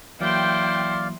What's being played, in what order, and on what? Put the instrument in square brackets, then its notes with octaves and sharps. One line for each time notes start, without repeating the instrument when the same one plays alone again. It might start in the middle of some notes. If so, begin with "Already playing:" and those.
[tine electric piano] E3 F#3 A#3 [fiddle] E4 C6 [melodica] D5 F5 [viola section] G5